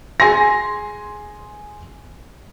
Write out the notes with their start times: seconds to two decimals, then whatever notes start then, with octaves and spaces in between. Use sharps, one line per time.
0.20 G#4 G#5 C6 A#6